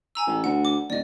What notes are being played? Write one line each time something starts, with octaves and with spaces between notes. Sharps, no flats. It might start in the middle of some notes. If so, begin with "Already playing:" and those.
G#5 A#5 E6
A1
D2 F#5
D6
D#1 D5 D#5